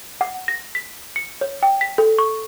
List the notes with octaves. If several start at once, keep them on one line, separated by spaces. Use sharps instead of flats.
F#5
A#6
B6
C#7
C#5
G5
B6
A4
C#6